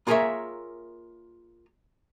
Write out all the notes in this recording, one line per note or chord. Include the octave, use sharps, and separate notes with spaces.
A#3 F4 G#4 A#4 C#5 E5